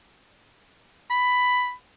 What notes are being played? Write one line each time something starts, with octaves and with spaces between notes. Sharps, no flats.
B5